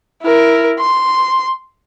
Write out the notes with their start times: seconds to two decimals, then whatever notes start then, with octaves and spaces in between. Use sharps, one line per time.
0.22 E4 A#4
0.80 C6